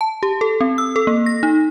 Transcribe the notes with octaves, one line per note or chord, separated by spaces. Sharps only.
A5
G4
A4
C4
E6
A4
A#3
A#6
D#4